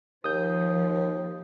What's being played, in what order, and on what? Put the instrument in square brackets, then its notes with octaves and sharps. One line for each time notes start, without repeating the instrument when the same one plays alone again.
[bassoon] D#2 [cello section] F3 [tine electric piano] D#6 G6